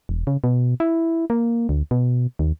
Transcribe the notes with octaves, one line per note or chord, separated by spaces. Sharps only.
E1
C#3
B2
E4
A#3
D2
B2
D#2